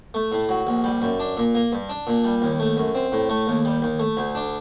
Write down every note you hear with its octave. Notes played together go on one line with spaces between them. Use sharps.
A3
A2
F#3
A#1
G3
F#2
D4
A#2
A#3
G2
D4
A#2
G3
D#2
A3
F#2
C4
A2
A3
D#2
G3
D#2
A3
D2
D4